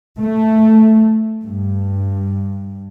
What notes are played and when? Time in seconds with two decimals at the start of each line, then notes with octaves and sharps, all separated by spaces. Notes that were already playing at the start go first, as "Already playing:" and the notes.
0.19 A3
1.45 G2